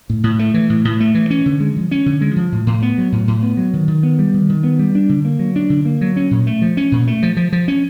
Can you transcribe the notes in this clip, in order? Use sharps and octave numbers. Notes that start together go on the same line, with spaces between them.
A2
A2
A3
E3
A2
A2
A3
E3
C#4
D3
G#3
F3
C#4
D3
G#3
F3
A2
A2
B3
F#3
A2
A2
B3
F#3
D#3
D#3
B3
G3
D#3
D#3
B3
G3
D4
D3
A#3
F#3
D4
D3
A#3
F#3
C#4
A#2
A3
F3
C#4
A#2
A3
F3
F3
F3
C#4